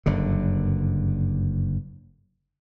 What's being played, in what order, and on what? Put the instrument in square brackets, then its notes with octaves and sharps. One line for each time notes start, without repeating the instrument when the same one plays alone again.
[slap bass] F#1 G2 D3